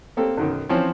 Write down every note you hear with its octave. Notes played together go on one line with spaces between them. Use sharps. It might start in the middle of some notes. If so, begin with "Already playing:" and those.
A3 A#3 C4 G4 A4
B1 F#2 D#3
E3 F3 C4 C#4